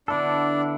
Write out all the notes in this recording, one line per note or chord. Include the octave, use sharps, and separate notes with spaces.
D3 B3 D4 E4 A4